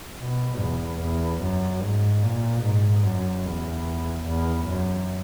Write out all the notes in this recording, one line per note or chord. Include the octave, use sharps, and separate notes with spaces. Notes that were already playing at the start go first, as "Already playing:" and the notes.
B2
E2
E2
F#2
G#2
A#2
G#2
F#2
E2
E2
F#2